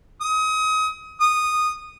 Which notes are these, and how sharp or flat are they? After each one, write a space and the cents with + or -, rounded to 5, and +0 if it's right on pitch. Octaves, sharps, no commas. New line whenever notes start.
D#6 +30
D#6 -10